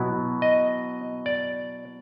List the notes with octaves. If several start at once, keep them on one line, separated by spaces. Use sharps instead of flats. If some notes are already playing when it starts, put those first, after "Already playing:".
Already playing: B2 F#3 B3 E4
D#5
D5